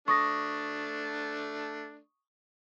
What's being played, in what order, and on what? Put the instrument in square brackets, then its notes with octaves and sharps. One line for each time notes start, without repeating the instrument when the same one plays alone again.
[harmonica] A3 D4 [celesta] C#6 D#6 A#6